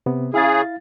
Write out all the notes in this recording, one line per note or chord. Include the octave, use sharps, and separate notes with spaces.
C3 B3
C#3 E4 G#4 F5 A6